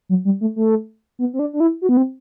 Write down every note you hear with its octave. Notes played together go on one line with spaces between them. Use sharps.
F#3
G3
A3
A3
B3
C4
D4
D4
E4
F#4
B3
C4